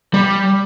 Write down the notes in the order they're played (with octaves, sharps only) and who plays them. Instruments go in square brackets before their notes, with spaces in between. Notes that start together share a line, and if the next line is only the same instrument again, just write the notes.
[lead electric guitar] G3